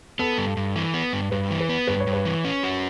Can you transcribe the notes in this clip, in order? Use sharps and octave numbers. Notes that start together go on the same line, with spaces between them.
B3 A4
G2
G2
E3
B3
G2
G2 B4
E3
B4
B3
G2 B4
C#5
G2
B4
E3
C#4
F#4